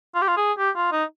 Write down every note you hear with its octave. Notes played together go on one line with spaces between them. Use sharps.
F4
G4
F4
G#4
G4
F4
D#4